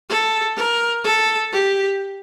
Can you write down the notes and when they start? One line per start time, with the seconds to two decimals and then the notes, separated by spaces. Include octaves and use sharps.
0.09 A4
0.57 A#4
1.04 A4
1.52 G4